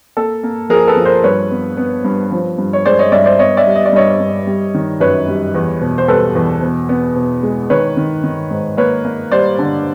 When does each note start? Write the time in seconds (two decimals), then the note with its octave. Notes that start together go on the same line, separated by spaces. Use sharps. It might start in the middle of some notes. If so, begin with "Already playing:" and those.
0.17 A#3 A4
0.43 A#3
0.70 F3 G#4 A#4
0.88 A4 B4
0.97 F3
1.05 A#4 C5
1.24 G2 B4 C#5
1.51 B3
1.77 B3
2.04 G2
2.32 F3
2.58 G2
2.73 C#5
2.86 G#3 C5 D5
2.99 C#5 D#5
3.12 G2 D5 E5
3.26 C5 D5
3.39 B3 C#5 D#5
3.57 D5 E5
3.66 G3
3.76 D#5
3.86 D5
3.93 G2 C#5 D#5
4.20 G2
4.47 G3
4.74 D#3
5.00 F#2 B4 C#5
5.28 G3
5.55 E2
5.81 B2
5.98 C5
6.08 G3 A4 B4
6.35 E2
6.62 B2
6.89 B3
7.16 B2
7.43 G#3
7.70 D#3 B4 C#5
7.97 D#3
8.24 D#3
8.51 G#2
8.77 A#3 B4 C#5
9.05 A#3
9.32 G3 C5 D5
9.59 D3